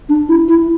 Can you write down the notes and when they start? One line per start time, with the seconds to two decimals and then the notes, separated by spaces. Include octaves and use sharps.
0.09 D4
0.29 E4
0.48 E4